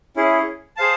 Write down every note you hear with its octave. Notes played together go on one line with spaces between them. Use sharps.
C#4 E4 G#4
G#4 C5 F5 A5